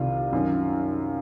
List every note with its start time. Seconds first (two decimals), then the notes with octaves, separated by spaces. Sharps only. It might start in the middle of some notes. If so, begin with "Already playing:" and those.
Already playing: C2 C3 D#3 F4
0.33 F#2 D#3